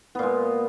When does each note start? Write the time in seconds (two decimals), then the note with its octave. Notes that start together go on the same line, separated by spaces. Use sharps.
0.15 B3
0.19 A#2
0.23 G#3